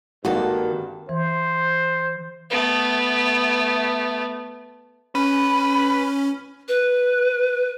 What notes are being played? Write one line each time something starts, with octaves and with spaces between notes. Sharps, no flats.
G#1 G2 D#3 A#3 F#4 A4
E3 C5
A3 B3
C#4 B4
B4